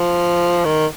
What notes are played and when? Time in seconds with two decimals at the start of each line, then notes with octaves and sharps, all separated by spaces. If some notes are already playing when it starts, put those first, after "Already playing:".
Already playing: F3
0.65 D#3